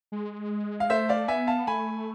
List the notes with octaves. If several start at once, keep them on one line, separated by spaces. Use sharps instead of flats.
G#3
F5
A3 C5 E5
D5 F5
B3 E5 G#5
F5 A5
A3 G#5 B5